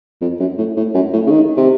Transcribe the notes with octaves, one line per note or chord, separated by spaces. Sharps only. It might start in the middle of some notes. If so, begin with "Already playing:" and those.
F2
F#2
A2
A2
F#2
A2
C#3
D#3
C3